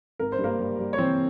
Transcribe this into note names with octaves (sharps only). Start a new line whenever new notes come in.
G#1 A#4
C5
G2
A#3 A#4
G3
G3
C#5
E3 C4 C5